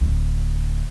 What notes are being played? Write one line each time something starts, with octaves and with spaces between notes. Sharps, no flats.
D1 D2